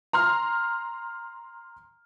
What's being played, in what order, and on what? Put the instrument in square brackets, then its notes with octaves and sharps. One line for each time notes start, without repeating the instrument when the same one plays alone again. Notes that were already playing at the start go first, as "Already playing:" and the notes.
[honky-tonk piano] A#5 C6 F6